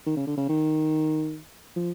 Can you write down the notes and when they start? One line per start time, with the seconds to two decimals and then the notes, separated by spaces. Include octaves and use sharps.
0.06 D#3
0.17 C#3
0.27 D3
0.37 C#3
0.49 D#3
1.76 F3